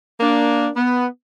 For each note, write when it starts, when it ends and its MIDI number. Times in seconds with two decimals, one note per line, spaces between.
0.20 0.67 58
0.20 0.67 62
0.75 1.05 59